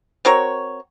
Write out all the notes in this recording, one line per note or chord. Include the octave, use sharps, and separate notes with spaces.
C4 F#4 A#4 C#5